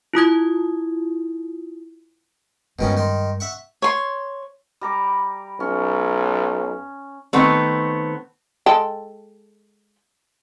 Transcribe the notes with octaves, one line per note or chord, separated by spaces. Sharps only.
E4 F4 D#6 G#6
G2 B2 D#3 G#3 C#4
D#3 C6
E5 F#5 C#6
C#5 C6
G3 A#5 D6
B1 C#4
D#3 A3 B3 C4
G#3 A4 G5